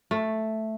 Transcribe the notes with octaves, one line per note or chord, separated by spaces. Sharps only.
A3